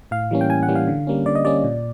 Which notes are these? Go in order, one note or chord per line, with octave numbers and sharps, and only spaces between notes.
A2 F5
E3 G3 A#3 C#4
G5
A2 G#5
F#5
E3 G3 A#3 C#4
F5
D3
G3 A#3 C#4
D3 D5
D#5
G3 A#3 C#4 D5
A#2